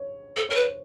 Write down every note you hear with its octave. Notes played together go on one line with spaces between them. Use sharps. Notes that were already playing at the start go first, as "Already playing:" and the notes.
Already playing: C#5
A4 C5
A#4 C#5
B4
C5